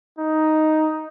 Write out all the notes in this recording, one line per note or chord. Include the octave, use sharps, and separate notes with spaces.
D#4